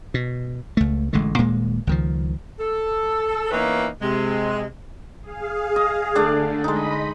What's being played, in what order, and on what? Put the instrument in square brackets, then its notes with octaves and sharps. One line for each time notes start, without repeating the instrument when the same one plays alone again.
[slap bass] B2
C#2 A3
A1 D3 G#3 A3
D#1 A#2 G#3 A#3
C#2 D#3 F3
[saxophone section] A4
E3 A#3 B3 C#4 D#4 B4
C3 G#3
[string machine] G#4 F5
[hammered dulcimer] D#5
[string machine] D3 [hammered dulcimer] A3 D4 D5
[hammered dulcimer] G#3 D#4 [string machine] D#5 B5